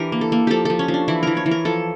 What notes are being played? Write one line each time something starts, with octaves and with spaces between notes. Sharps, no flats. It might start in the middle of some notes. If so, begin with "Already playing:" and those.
Already playing: E3 D4 G4 A#4
A#3
A4
A#3
F3 G4 A4
F3 A4
C#4
F3
D4
E3 E4
E3 A#4
C#5
E3
A#4
F3 A4